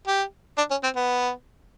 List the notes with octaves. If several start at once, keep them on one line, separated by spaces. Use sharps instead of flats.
G4
D4
C#4
C4
B3